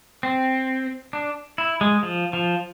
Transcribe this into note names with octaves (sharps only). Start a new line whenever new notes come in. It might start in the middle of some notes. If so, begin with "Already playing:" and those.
C4
D4
E4
G#3
F3
F3